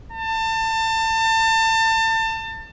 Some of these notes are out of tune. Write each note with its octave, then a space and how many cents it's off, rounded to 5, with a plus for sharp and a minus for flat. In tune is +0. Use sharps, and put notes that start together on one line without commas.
A5 +30